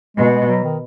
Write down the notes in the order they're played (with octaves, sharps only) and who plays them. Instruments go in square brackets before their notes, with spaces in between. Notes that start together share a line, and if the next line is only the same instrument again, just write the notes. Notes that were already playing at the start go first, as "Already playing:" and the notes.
[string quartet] B2 [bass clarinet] G#3
[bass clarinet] G#3
F#3
D#3